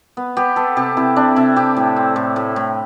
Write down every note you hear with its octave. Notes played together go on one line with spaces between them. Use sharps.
B3
B3 G4
B3 A4
C3 G4
C3 E4
C3 D4
C3 E4
C3 G4
A2
C4
A2
A2
A2